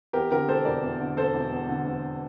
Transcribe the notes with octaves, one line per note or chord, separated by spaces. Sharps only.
E2 G4 A#4
D3 G4 A#4
E1 A4 C5
E1 A#4 D5
E2
D3
E1 A4 C5
E1
E2
D3
E1